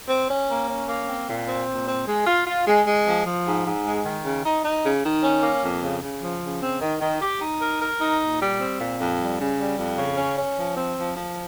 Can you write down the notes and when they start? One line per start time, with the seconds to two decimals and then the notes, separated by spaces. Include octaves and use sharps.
0.09 C4
0.30 C#4
0.49 A#3
0.70 C#4
0.89 A#3
1.08 C4
1.29 A#2
1.48 C4
1.68 A#2
1.88 C4
2.07 G#3
2.27 F4
2.47 F4
2.67 G#3
2.86 G#3
3.06 F3
3.26 F3
3.46 G#2
3.65 G#2
3.85 G#3
4.05 D#3
4.25 C#3
4.45 D#4
4.65 D#4
4.84 C#3
5.05 D#3
5.23 C#4
5.43 A#3
5.63 F2
5.83 C#3
6.02 C#3
6.23 F3
6.43 C#3
6.62 C4
6.81 D#3
7.01 D#3
7.21 G4
7.41 D#4
7.61 A#4
7.81 A#4
8.01 D#4
8.20 A#2
8.40 G3
8.60 C4
8.79 A#2
9.00 F2
9.19 G3
9.39 C#3
9.59 G3
9.78 F2
9.98 C#3
10.18 C#4
10.38 C#4
10.58 F3
10.77 C4
10.98 F3
11.16 F3